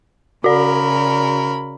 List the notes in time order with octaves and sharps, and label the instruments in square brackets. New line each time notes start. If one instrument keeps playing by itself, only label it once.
[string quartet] C#3 A#4 B5 [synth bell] F#4 D5